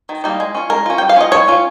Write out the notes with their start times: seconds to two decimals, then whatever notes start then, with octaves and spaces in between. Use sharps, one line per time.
0.09 D#3
0.24 G3 A#3 D#4
0.40 G#3
0.55 C#4 F4
0.70 G#3 A#4
0.86 C#4 F4
0.98 G3 G5
1.09 F5
1.16 C#4 F4 D#5
1.32 G3 C#5
1.48 C#4 F4